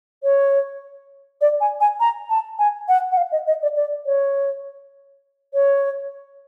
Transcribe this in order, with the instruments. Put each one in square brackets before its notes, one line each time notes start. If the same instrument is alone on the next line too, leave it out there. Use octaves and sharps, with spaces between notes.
[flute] C#5
D5
G#5
G#5
A#5
A5
G#5
F#5
F#5
F5
D#5
D#5
D5
D5
C#5
C#5